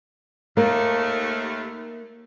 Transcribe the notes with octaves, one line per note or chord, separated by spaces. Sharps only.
D#2 A3 A#3